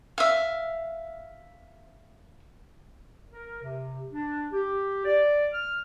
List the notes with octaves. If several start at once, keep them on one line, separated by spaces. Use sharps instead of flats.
E5 F5
A#4
C3
D4
G4
D5
F6